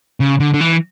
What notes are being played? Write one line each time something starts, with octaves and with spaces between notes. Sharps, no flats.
C#3
D3
D3
E3